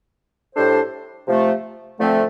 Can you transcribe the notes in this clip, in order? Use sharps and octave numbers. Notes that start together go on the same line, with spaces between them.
A2 G3 D4 A4 C5
C3 F3 A3
D3 F3 A3 C4